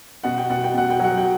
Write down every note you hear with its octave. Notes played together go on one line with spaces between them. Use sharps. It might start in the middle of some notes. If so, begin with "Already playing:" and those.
B2 F#5
G5
B2 F#5
G5
B2 F#5
G5
F#3 F#5
G5